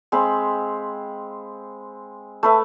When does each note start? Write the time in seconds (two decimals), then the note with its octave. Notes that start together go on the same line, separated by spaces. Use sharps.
0.12 G#3 C4 F5 B5
2.43 A3 B4 E5